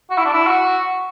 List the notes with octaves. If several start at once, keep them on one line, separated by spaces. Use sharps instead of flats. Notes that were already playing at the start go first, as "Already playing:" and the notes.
F#4
E4
D4
E4
F#4